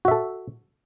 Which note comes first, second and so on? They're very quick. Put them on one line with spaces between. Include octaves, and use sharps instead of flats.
F#4 E5 A4